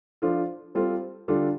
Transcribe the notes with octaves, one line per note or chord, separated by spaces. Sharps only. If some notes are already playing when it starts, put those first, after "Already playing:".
F3 D4 F4 A4
G3 C4 F4 A4
D3 G3 D4 F4 A4